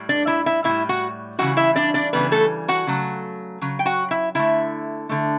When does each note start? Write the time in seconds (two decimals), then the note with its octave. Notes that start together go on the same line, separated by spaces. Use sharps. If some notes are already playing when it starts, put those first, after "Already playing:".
Already playing: A2 G3
0.09 D4 D5
0.27 E4 E5
0.46 E4 E5
0.64 A2 G3 E4 E5
0.89 F#4 F#5
1.39 C#3 E3 G3 F#4 F#5
1.57 E4 E5
1.76 D4 D5
1.94 D4 D5
2.13 C#3 E3 G3 B3 B4
2.32 A3 A4
2.68 F#4 F#5
2.87 C#3 F#3 A3
3.61 C#3 F#3
3.79 G5
3.86 F#4 F#5
4.11 E4 E5
4.35 D3 A3 E4 E5
5.09 D3 A3